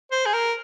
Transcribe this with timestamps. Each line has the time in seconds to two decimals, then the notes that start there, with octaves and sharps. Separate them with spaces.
0.12 C5
0.26 G#4
0.33 A#4